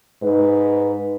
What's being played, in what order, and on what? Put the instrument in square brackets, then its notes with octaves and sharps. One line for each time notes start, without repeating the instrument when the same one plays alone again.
[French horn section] G#2 D#4 B4